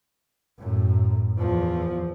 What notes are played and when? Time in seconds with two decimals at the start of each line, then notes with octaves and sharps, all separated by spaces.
0.59 F#2 A2
1.38 E2 F3